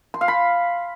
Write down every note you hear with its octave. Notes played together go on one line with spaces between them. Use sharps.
C6
F5
B5